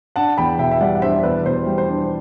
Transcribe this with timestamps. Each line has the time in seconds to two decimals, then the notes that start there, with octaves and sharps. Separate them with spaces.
0.16 D4 F#5 A5
0.38 E2 G5 B5
0.59 B2 E5 G5
0.71 E5
0.81 G3 D5 F#5
0.95 F#5
1.02 D4 C5 E5
1.23 E2 B4 D5
1.45 B2 C5
1.67 G3
1.78 C5
1.88 D4